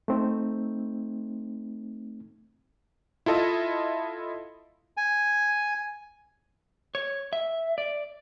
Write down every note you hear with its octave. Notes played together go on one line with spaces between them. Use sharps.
A3 C4 D#4
E4 F4 A4 D#5 E5
G#5
C#5
E5
D5